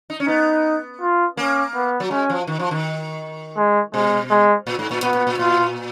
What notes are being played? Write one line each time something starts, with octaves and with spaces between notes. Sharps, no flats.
D#4
C#4
B3 D#4
F4
A#3 C#4
B3
F#3
G#3 C#4
F3
D#3
F3
D#3
G#3
B2 G#3
G#3
A#2
G#2
A#2
A#2 B3
A#2
A#2
A#2 F4